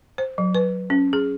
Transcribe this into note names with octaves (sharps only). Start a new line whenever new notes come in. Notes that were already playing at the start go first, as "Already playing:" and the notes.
C5
F#3
B4
C#4
G#4